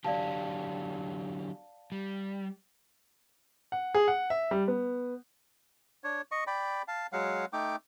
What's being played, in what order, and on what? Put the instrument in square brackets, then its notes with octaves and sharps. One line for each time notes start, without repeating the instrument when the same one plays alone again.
[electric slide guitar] D3 F#3 G4 [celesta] D5 F5 A5
[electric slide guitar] G3
[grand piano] F#5
G#4
F#5
E5
G3
B3
[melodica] D4 C#5
D#5 C#6
D5 G5 B5
F5 A5
F#3 G#3 F5 F#5
A3 D#4 G5 D6